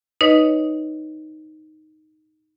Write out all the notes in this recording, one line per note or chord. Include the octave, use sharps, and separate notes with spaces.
D#4 B4 C#5 D#5